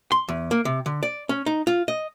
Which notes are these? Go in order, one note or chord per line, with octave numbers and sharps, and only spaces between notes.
C6
E2
A#3
C3
D3
D5
C#4
D#4
F4
D#5